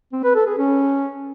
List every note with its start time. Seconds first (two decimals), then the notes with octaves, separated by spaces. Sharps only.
0.13 C4
0.24 B4
0.35 A4
0.47 G#4
0.58 C#4